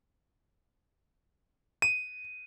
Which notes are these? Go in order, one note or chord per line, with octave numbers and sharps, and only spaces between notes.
D#7